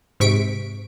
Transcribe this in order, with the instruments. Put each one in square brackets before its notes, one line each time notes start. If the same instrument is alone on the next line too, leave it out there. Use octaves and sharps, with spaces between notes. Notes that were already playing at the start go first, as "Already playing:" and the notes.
[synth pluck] G#2 C3 C#6 B6 D7